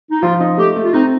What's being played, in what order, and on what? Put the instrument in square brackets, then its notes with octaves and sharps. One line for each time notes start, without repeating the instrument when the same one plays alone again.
[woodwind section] D#4
[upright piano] F3 [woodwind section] F4
[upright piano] D#4
[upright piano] A3 [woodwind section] G4
[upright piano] A3
[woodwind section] F4
[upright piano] C4 [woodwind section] D#4